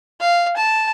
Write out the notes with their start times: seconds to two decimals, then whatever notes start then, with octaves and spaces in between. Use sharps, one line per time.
0.21 F5
0.56 A5